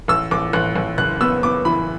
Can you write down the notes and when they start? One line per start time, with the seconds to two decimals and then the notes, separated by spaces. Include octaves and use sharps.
0.08 A1 E6
0.31 A1 D6
0.53 A1 F#6
0.76 A1
0.98 F#1 F#6
1.21 B3 E6
1.43 B3 D6
1.65 E3 B5